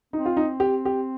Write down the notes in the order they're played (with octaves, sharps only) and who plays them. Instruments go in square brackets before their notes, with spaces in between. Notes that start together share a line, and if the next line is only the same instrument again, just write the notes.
[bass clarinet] C4 [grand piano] D#4
[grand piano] F4
D#4
G4
G4